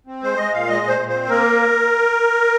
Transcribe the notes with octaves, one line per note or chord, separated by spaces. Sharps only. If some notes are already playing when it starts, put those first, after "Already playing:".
C4
G#3 C5
G#3 D#5
A#2 F5
G#3 D#5
A#2
C5
A#2
C5
C4
A#3 A#4